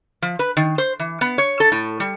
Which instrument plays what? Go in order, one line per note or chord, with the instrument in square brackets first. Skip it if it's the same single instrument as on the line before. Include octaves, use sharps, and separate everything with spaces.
[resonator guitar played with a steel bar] F3
B4
D#3
C5
E3
B3
C#5
A4
A2
G3